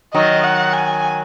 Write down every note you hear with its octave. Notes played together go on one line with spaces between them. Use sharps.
D#3 F#3 D#5
F#5
G#5